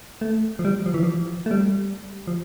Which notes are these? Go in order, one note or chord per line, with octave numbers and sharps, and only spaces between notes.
A3
F3
G3
F3
E3
F3
A3
G3
F3